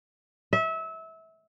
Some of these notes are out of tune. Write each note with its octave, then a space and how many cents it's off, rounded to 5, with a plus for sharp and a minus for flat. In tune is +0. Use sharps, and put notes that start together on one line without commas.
E5 -25